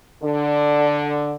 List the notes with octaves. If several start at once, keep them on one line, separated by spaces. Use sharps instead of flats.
D3